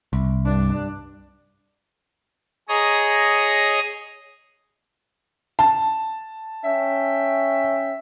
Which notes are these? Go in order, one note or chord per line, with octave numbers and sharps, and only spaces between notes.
C2
G2 D4
G#4 C#5 D#5 A#5
A5
C#4 E5 G5